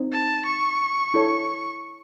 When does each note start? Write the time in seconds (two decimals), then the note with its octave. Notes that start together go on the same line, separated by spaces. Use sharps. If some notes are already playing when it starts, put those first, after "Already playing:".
Already playing: C4 D#4
0.12 A5
0.45 C#6
1.14 E4 A4 C#5